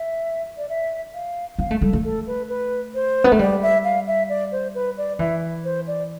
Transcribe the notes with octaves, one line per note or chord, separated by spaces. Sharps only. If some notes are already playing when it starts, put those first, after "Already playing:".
Already playing: E5
D5
E5
F5
B3 F5
A3
G3 A4
A3
A4
B4
B4
C5
B3
A3
G3 D5
E5
F5
E5
D5
C5
B4
D5
E3 E5
C5
D5